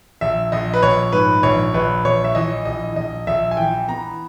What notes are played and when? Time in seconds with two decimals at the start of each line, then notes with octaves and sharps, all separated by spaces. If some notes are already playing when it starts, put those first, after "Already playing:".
0.21 A#1 E5
0.52 A#1 D#5
0.74 B4
0.83 A#1 C#5
1.13 G#2 B4
1.43 A#1 C#5
1.74 A#1 B4
2.05 A#1 C#5
2.24 E5
2.35 E3 D#5
2.65 A#1 D#5
2.96 A#1 D#5
3.27 A#1 E5
3.51 G#5
3.57 E3 G5
3.88 B3 A#5